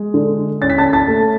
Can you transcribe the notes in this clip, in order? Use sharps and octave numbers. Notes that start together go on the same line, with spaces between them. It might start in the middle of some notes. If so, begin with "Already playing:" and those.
Already playing: G#3
D3
C#4 A6
B6
A5 A6
A5 A6
A3